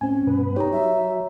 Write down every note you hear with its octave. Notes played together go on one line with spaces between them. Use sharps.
A2 C4 C#4 G#5
G2 B2 B3 B4
D#4 G4 C#5 A#5
F#3 E5